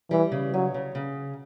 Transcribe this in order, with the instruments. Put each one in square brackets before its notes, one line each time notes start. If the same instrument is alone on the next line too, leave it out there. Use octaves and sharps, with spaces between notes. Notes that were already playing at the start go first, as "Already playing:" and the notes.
[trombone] E3 [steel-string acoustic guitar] G3
[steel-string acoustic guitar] C#3
[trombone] F#3 [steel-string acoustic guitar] C#4
[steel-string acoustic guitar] C#3
C#3